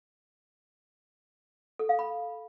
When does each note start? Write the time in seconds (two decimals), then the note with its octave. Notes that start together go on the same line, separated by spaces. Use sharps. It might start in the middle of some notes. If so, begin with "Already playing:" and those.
1.79 A4
1.89 F5
1.99 B5